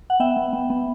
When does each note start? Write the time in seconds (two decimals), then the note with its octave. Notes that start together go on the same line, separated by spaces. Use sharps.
0.10 F#5
0.20 B3 E5 G5
0.36 B3
0.53 B3
0.70 B3